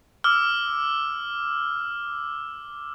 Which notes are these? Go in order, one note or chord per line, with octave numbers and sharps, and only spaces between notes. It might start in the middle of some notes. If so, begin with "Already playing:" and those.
D6 E6 F6